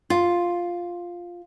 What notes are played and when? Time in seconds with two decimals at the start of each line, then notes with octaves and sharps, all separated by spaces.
0.10 F4